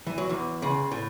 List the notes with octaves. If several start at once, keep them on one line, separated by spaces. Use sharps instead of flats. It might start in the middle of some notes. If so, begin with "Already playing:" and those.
E3
F#3
E2 E3
C#2 C#3
A2